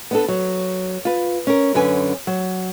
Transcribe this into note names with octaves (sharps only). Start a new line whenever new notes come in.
B3 D4 A4
F#3
F4 B4
C#4 A#4
F#2 D3 C#4 B4 G#5
F#3